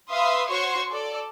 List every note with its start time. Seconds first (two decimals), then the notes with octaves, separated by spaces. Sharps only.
0.10 B4 E5 F5 C6 D#6
0.48 F#4 C5 C#5 C6 C#6
0.91 A4 D5